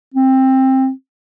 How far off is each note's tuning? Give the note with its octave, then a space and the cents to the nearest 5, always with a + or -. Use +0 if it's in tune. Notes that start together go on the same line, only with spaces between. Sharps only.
C4 +15